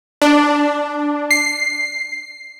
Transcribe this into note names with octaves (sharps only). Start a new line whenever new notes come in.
D4
C7